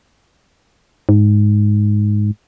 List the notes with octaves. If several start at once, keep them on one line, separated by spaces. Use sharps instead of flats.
G#2